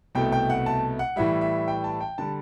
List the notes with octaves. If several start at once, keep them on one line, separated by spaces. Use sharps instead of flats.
C2 B2 A3 G5
G5
F#5
A5
F#5
A2 E3 G3 E5
E5
G5
A5
G5
D3 G3 A5